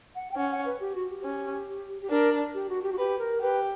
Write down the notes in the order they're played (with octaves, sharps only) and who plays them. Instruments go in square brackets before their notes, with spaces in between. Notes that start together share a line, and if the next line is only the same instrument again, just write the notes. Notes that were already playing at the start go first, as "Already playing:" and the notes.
[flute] F#5
G5
[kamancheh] C#4 [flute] F#5
[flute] F#5
B4
G4
F#4
G4
[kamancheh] C#4
[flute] G4
[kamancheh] D4 [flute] A#4
[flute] G4
F#4
G4
F#4
[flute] G4 [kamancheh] B4
[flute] A#4
[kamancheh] G4 [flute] B4